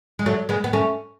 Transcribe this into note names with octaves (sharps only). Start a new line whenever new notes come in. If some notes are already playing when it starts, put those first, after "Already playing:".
G#3
F#3 A3
G#3 B3
B3
A3 C#4